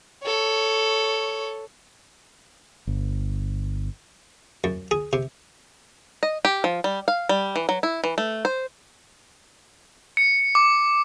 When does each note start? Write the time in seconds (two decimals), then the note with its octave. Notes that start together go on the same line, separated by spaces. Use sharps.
0.23 A4 C#5
2.87 G1
4.64 F#2
4.91 G#4
5.13 C3
6.23 D#5
6.45 G4
6.64 F3
6.84 G3
7.08 F5
7.29 G3
7.56 E3
7.69 F#3
7.83 E4
8.04 E3
8.18 A3
8.45 C5
10.17 C#7
10.55 D6